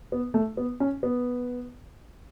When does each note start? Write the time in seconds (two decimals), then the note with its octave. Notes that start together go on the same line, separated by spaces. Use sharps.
0.12 B3
0.34 A3
0.57 B3
0.80 C#4
1.03 B3